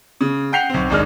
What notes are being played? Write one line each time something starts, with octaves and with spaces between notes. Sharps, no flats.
C#3
F#5 G5 G6 C7 F7
B1 C4
G#1 D#2 G#3 D4 D#4 F6